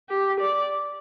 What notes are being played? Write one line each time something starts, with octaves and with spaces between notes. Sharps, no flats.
G4
D5